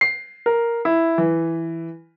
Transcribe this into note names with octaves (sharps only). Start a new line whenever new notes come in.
C7
A#4
E4
E3